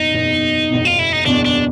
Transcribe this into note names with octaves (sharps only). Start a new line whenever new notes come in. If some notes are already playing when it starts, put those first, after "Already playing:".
Already playing: F#1 E2 B2 D#4
F#1 E2 B2
F#1 E2 B2
F4
E4
D#4
F#1 E2 B2 D4
D4